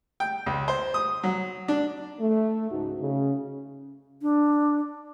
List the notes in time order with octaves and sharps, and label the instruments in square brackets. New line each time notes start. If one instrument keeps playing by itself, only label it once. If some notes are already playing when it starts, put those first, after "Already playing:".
[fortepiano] G5
C#2
C5
D#6
F#3
D4
[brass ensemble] A3
C#2 G#2 D#4 F#4
C#3
[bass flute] D4